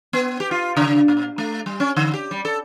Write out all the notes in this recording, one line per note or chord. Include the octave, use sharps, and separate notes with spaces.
B3
G4
F4
C#3
A#2
A3
G3
C#4
D3
G4
G3
A4